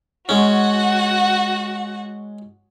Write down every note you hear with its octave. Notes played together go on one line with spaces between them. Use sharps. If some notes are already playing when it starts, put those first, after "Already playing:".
G#3 C#4 F#4 F#5